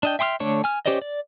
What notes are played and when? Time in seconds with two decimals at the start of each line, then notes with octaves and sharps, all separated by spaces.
0.03 D4 D#5 G5
0.19 E5 G5 C6 D#6 F6
0.40 D3 A3 D4 C#5
0.64 G#5 F6
0.86 C#4 G4 C5 D5 D#5
1.02 D5